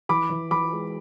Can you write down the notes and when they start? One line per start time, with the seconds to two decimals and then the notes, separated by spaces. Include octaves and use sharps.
0.09 E3 B5 D6
0.30 E3
0.51 E3 B5 D6
0.73 G#3